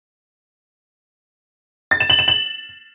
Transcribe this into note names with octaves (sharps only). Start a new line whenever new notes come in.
A6
E7
F#7
E7
F#7